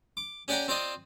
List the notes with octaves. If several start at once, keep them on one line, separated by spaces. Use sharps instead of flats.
D6
C#4 G4 D5 F#5 G5 A#5
C4 F4 C5 D5 D#5